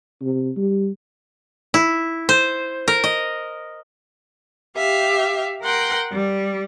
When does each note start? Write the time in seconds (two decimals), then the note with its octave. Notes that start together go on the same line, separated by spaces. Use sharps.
0.21 C3
0.57 G3
1.74 E4
2.29 C5
2.88 A#4
3.04 D#5
4.76 G4 E5 F5
5.62 A#4 F#5 G5 C6
6.12 G3